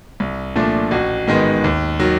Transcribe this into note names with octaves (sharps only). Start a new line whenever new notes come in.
C2
A#2 F3 A3 D4
A1 F#4
G#2 D#3 G#3 B3
D#2
D#3 F#3